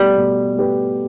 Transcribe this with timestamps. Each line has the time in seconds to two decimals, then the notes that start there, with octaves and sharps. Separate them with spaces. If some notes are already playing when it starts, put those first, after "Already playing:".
Already playing: B2 G3 A3 G4 B4
0.17 B2
0.56 A3 G4 B4